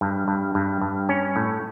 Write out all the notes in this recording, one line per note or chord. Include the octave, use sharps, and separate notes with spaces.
G2
G2
G2
G2
C#4
A2